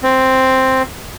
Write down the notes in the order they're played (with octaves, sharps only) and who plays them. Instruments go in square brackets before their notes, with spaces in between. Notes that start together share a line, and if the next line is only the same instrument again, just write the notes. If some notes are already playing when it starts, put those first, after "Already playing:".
[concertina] C4